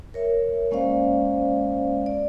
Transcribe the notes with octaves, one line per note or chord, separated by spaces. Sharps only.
A#4 C#5 E5
G#3 A#3 C#4 C5 D5 F5
D5